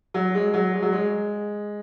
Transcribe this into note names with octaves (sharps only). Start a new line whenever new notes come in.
F#3
G#3
F#3
G#3
F#3
G#3